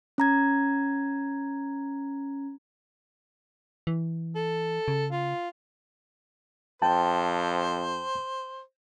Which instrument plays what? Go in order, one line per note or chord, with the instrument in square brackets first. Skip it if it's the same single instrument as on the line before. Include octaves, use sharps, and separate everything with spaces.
[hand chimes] C#4 A#5 G#6
[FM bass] E3
[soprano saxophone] A4
[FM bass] C#3
[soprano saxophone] F4
[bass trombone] F2 [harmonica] C5 [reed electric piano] G5 A5